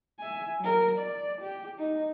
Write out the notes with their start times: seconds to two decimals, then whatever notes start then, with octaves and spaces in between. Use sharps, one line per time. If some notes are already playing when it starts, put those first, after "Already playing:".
0.19 E5 G#5
0.60 F#3 A#4
0.98 D5
1.41 G4
1.78 D#4